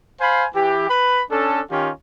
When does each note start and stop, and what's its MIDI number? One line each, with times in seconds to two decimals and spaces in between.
0.21 0.46 72
0.21 0.46 77
0.21 0.46 80
0.21 0.46 83
0.55 0.85 52
0.55 0.85 67
0.90 1.23 71
0.90 1.23 83
1.31 1.61 61
1.31 1.61 62
1.31 1.61 69
1.71 1.91 51
1.71 1.91 61
1.71 1.91 65
1.71 1.91 67